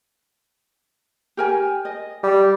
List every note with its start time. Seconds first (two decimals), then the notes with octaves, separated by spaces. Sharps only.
1.37 G4 A#4 G#5
1.85 D#5
2.23 G3